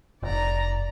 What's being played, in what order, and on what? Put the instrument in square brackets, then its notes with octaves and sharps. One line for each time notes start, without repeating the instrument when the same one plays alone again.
[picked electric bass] F1 [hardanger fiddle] D5 A#5